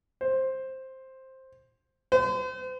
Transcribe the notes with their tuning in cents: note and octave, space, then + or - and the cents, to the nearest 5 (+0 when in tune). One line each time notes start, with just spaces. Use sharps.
C5 +10
C5 -40